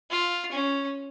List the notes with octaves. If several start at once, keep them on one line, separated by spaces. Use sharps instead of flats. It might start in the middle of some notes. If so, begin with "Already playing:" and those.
F4
C#4